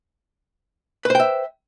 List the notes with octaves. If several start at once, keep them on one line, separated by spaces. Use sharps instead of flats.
B4 C5 E5 G5